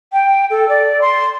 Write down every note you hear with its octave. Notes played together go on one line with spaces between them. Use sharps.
G5
A4
D5
C6